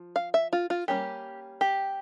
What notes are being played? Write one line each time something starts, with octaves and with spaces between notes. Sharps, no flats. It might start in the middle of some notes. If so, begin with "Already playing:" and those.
Already playing: F3
F5
E5
F4
F4
G3 A#3 C#4 G4
G4